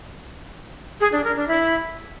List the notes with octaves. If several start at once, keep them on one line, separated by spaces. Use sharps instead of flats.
G#4
D4
A#4
D4
E4